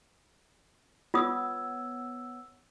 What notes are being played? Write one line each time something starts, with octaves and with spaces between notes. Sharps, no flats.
B3 F4 C#5 D#6 E6